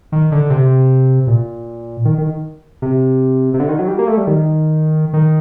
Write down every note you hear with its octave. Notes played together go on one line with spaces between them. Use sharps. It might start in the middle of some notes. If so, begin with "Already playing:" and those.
D#3
D3
C3
A#2
D#3
D#3
C3
C3
D3
D#3
F#3
G3
A#3
A3
G3
D#3
D#3